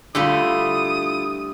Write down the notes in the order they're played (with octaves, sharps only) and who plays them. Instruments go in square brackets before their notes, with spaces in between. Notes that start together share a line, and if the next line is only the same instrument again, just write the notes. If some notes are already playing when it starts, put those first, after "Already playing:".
[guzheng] D3 G3 A3 [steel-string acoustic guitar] E4 F4 [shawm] D#6